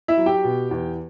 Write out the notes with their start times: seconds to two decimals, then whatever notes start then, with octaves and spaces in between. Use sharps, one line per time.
0.08 E4 E5
0.17 F#3
0.26 G4 G5
0.45 B2
0.71 E2